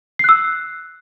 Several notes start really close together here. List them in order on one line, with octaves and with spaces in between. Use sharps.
C7 F#6 E6